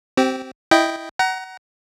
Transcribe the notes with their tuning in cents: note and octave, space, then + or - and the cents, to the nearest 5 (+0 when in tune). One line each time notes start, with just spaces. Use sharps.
C4 +0 G4 -30
E4 +0 D#5 +0 G5 +0
F#5 +25 A#5 +15